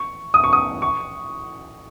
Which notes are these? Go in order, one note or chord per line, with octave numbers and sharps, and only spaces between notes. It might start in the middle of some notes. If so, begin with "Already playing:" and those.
Already playing: C#6
D#6
C#6
D#6
C#6